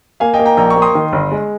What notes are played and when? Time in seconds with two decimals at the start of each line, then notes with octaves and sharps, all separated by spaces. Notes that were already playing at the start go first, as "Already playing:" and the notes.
0.20 A#3 F5 G#5
0.34 D#5 G5
0.39 A#3
0.45 G5 A#5
0.57 A#1 G5 A#5
0.70 A#5 C#6
0.76 A#3
0.82 C6 D#6
0.95 D#3
1.13 G1
1.32 G#3